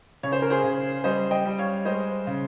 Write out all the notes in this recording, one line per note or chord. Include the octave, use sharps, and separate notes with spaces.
C#3 C#5
C5
A#4
G#4 C5
C#3
G3 C5 D#5
D#5 G5
G3
C#5 F5
G#3 C5 D#5
C#3